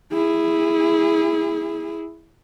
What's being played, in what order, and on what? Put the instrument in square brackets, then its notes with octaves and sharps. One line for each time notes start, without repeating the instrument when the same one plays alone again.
[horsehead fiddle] E4 G#4